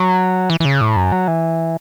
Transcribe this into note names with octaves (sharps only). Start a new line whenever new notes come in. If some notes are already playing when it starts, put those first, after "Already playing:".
Already playing: F#3
E3
E3
C#3
A2
F#2
F#3
E3